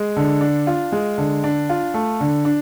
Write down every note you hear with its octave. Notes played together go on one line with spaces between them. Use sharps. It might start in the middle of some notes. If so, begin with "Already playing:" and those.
Already playing: G#3
D3
D4
F4
G#3
D3
D4
F4
A3
D3
D4